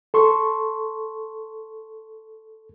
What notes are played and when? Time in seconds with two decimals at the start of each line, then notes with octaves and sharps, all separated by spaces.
0.14 A4 C6 C#6